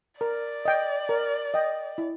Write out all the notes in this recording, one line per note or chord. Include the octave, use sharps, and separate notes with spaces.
A#4 D5
D#5 G5
A#4
D#5 G5
E4